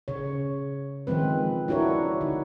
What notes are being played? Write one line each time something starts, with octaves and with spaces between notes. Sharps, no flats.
C#3 C#5
D#3 F3 G#3 C4 B4
D4 E4 F#4 A#4 C#5
D3 D#4